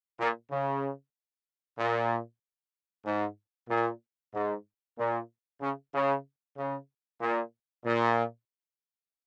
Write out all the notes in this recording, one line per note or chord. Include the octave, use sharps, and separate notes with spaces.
A#2
C#3
A#2
G#2
A#2
G#2
A#2
C#3
C#3
C#3
A#2
A#2